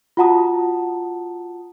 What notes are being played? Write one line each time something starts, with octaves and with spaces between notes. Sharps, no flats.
F4 F#4 F#5 A5 A#5 D#6